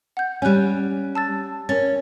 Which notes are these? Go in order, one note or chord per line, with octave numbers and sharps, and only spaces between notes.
F#5 G6
G3 C#4 G#5 F#6
A5 E6 A6
C#4 A#4 C#5 A6